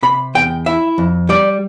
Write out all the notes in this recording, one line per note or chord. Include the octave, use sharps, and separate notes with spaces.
C3 B5
E2 G5
E4 E5
F2
G3 D5